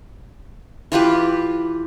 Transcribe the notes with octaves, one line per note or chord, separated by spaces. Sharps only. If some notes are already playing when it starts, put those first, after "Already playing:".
E3 F4 G4 B4